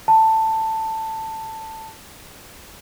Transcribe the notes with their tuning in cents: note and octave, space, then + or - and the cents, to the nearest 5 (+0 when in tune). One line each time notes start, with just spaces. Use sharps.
A5 +10